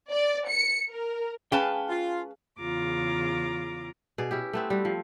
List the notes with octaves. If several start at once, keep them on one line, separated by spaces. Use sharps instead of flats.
D5
C#7
A#4
C#4 G#4 B4 F5 G5 A5
F4
E2 C#3 F4 A#5 D6
B2 G#4 D5
C#4 E4 G4
A3 B3 C4
G3 F#4
F3